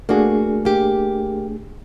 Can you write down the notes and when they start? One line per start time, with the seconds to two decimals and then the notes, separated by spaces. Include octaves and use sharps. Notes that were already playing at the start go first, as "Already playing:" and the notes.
0.09 A3 A#3 D4 F#4 G#4
0.65 A#3 G4